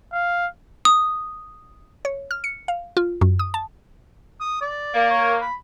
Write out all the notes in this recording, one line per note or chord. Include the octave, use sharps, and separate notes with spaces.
F5
D#6
C#5
F6
C#7
F5
F4
F#2
D#6
A5
D#6
D5
A#3
C#5
B5